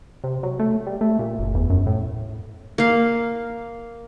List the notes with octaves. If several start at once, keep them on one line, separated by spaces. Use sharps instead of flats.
C3
F#3
A3
G3
A3
A#2
F#1
E2
F#2
A2
A#3 F5